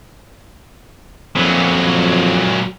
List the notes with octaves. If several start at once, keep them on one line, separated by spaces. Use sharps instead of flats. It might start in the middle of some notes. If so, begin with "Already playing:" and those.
F2 A#2 F#3